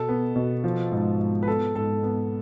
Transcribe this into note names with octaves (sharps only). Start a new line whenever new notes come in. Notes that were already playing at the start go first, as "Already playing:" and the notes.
Already playing: B2 A4
B3
B2
F3
G#2
G#2
B4
B3 A4
G#2 A4
B3